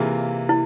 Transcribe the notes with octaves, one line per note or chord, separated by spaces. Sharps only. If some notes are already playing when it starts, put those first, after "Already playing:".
Already playing: C3 E3 A#3 F4 G#4
E4